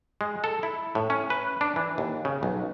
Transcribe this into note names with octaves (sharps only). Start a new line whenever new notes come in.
G#3
A4
E4
A2
C#4
B4
D4
E3
D#2
C#3
B1